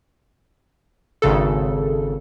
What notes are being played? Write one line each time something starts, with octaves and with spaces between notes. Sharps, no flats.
G#1 C#3 A4